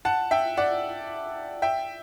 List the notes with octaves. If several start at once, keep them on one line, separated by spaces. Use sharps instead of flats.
F#5 A5
E5 G5
D5 F#5
E5 G5